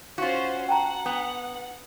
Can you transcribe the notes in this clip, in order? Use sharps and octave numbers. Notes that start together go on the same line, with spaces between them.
C#4 F4 F#4 C5 F5
F#5 G5 A5 A#5
B3 D4